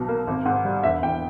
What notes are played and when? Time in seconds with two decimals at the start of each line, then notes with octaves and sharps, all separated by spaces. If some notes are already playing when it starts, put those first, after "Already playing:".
Already playing: B1 B2
0.08 A#3
0.27 G#1
0.45 G#2
0.65 G3
0.83 E1 E5
1.02 E2 G5